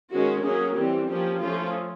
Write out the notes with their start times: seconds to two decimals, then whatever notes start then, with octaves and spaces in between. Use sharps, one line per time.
0.10 D#3 G#3 C#4 F#4
0.44 F#3 A#3 C#4 G#4
0.76 E3 G3 C4 G4
1.08 F3 A#3 C#4 G4
1.41 F3 A3 C#4 F4